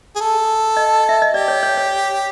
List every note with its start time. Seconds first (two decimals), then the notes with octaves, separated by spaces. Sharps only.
0.16 G#4
0.21 A4
0.77 D#5
1.09 E5
1.22 D#5
1.34 G4 D5
1.48 C#5
1.63 C#5
1.77 C#5